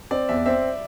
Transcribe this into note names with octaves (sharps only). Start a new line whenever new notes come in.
C4 D5
E2 E5
C4 E5